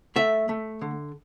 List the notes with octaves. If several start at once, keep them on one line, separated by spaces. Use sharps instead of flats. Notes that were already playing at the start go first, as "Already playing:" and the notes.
A3 E5
A3
D3